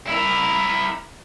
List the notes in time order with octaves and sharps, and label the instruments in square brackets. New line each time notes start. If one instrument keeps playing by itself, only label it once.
[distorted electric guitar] E4 A#4